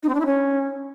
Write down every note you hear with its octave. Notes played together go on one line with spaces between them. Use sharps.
D#4
C4
D4
E4
C#4